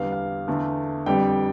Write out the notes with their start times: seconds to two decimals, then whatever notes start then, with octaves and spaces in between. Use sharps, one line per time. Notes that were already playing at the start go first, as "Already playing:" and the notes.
Already playing: E2 D3 G3 B3 F5
0.12 F5
0.48 E2 D3 A3
1.06 F2 D3 G3 B3 G5